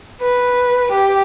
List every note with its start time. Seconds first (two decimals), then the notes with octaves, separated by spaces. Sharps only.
0.21 B4
0.91 G4